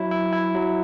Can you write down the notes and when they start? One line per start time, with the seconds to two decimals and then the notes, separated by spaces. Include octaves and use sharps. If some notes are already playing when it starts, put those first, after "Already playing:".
Already playing: F#3 E4
0.11 E4
0.32 E4
0.55 F#3